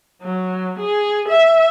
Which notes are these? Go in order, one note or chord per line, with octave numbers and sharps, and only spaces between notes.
F#3
G#4
E5